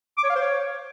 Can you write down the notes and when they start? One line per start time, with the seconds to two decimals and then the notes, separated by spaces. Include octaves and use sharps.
0.18 D6
0.24 C#5
0.30 F5
0.36 C5
0.42 C#5